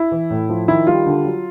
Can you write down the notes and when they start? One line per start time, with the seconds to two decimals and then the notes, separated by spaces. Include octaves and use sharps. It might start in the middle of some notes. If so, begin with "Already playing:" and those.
Already playing: E4
0.12 E3
0.30 A2
0.49 F3
0.68 D#3 E4
0.87 G3 F4
1.06 D3
1.25 F#3